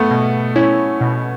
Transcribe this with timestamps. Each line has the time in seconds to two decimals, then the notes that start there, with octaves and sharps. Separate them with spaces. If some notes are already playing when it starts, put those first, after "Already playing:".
Already playing: A3 B3
0.11 B2
0.56 C#4 E4
1.01 B2